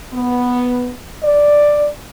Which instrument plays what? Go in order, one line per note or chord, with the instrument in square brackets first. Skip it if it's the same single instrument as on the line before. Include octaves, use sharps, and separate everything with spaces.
[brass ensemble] B3
D5